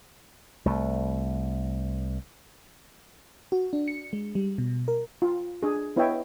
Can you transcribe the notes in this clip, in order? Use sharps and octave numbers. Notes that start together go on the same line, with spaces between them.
C2 A3
F#4
D4
C#7
G#3
G3
B2
A#4
F4
D4 G#4
B3 E4 C#5 D#5 E5 G5